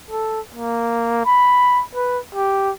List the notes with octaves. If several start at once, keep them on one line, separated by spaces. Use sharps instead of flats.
A4
A#3
B5
B4
G4